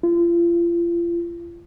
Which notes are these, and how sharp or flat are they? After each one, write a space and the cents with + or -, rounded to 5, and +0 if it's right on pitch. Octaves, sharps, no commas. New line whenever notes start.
F4 -35